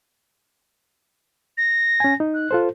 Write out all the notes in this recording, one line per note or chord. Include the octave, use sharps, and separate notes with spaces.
A#6
C#4 G#5
D#4
F#6
F4 A4 C5